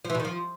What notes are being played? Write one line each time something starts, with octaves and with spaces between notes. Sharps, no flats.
F3
E3
B2
D#3
F3